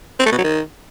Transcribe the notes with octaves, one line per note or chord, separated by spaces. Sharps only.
C4
A3
B2
F#3
D#3